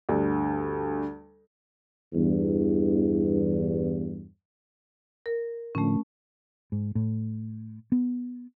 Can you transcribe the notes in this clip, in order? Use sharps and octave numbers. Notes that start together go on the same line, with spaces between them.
D2 G2
E2 G2
A#4
A2 D3 F3 A3 C#4
G#2
A2
B3